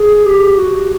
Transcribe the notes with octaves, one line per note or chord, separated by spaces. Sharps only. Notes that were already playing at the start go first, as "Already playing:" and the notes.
Already playing: G#4
G4
F#4